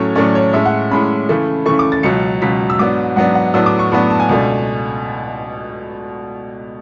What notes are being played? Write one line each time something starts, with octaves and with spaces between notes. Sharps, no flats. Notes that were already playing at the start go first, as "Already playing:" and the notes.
Already playing: A2 F#3 A3 C#4 C#5
A2 F#3 A3 C#4 D5
C#5
A2 G#3 C#4 E5
F#5
A2 G#3 C#4 B5
C#3 E3 A3
C#3 E3 A3 C#6
D6
A6
C#2 B2 F#3 C#7
C#2 B2 F#3 B6
E6
G#2 F#3 B3 D4 D6
G#2 F#3 B3 D4 F#5
F#5
A2 F#3 B3 D4 E6
D6
C#6
A2 F#3 B3 D4 B5
A5
G#5
C#2 B2 A3 D4